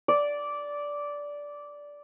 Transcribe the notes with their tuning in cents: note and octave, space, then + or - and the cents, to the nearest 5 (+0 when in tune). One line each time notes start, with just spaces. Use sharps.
D5 -10